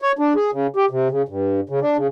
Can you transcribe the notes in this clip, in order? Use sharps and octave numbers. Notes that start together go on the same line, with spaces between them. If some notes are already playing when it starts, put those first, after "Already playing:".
C#5
D4
G#4
C#3
G4
C3
C#3
G2
C#3
D4
C#3